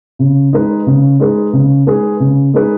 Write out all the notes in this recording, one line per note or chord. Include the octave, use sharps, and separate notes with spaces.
C#3
G#3 D#4 G#4 B4
C#3
G#3 D#4 G#4 B4
C#3
G#3 D#4 G#4 B4
C#3
G#3 D#4 G#4 B4